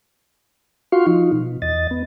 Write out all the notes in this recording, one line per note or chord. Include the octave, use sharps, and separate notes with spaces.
F4 F#4 F5 C6 C#6
F3 D#4 F4
B2
E2 D#5 A6
B3